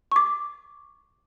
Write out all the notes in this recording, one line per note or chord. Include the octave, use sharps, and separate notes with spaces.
C#6 D6